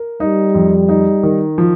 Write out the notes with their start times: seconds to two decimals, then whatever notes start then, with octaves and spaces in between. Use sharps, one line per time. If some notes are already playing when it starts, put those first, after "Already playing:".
Already playing: A#4
0.20 G3 D#4
0.54 F2
0.89 D#4
1.23 D#3
1.58 F3